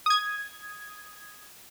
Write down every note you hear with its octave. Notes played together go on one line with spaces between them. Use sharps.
D#6 G#6